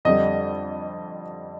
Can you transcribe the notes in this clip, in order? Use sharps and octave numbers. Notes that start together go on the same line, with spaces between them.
F2 D3 G3 D#5